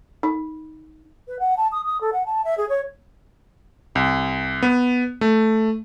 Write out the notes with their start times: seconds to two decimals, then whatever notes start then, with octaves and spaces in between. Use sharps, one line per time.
0.23 D#4
1.28 B4
1.39 F#5
1.57 A5
1.72 D#6
1.85 D#6
2.01 A4
2.13 F#5
2.26 A5
2.45 E5
2.58 G#4
2.69 C#5
3.95 C2
4.62 B3
5.21 A3